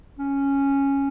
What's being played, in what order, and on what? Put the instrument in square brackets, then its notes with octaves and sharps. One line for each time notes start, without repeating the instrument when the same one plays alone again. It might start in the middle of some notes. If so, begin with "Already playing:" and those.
[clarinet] C#4